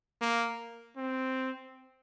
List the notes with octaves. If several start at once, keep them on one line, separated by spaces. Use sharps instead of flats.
A#3
C4